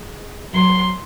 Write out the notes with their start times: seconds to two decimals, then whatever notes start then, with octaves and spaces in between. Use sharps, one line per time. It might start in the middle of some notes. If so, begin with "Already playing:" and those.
Already playing: G#3
0.53 F#3 C6